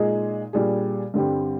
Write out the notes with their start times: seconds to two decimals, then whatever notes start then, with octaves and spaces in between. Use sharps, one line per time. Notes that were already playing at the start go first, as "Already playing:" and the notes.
Already playing: A#2 G#3 D#4 G#4
0.53 A#2 G3 D4 G#4
1.14 G2 D3 G3 C4 G4